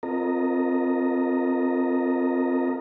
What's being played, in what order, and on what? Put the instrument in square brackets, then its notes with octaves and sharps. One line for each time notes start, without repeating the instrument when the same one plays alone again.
[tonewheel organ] C4 F4 A4 A#4 D#5 A#5